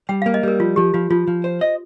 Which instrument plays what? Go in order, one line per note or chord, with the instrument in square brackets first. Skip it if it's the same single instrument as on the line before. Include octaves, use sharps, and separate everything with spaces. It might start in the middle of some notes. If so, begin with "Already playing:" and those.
[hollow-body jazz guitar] G3 [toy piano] G5
[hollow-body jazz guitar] A#3 [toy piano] F5
[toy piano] D#5
[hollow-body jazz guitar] G3 [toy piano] A#4
[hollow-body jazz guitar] F3 [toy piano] F4
[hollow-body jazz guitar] F3 [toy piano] G4
[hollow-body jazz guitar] F3 [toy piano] F4
[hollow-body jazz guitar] F3 [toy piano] F4
[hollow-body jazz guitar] F3
C5
D#5